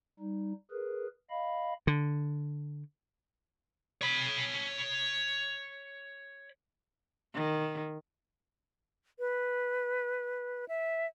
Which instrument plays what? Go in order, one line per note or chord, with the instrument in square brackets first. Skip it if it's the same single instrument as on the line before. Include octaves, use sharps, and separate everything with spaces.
[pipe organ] G3 D#4
G#4 A#4 B4
D#5 F5 B5
[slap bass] D3
[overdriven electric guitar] C#5 B5
[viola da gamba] D#3
[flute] B4
E5